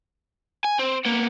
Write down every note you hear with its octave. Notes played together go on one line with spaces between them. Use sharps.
G#5
C4
A#3 B3